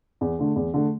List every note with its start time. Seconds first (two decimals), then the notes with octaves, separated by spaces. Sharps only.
0.21 E2
0.39 D3 A3
0.56 E2
0.74 D3 A3